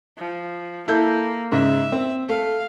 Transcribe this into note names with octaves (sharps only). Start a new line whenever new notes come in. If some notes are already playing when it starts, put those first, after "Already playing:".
F3
A#3 E4 A4 G6
G#2 C#3 E5
C4
A3 F5